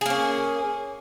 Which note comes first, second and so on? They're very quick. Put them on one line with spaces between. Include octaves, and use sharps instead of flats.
G#4 A#3 C#4